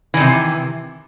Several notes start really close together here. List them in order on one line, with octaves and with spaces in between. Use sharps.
E3 D#3 C3